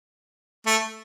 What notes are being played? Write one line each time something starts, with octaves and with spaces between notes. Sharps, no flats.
A3